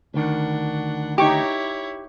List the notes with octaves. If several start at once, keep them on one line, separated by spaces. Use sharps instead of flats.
D2 D#3 D4 F#5
D#4 E4 G4 C#5 C#6 D6